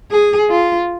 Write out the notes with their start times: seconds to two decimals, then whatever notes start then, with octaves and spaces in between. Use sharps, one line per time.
0.11 G#4
0.50 F4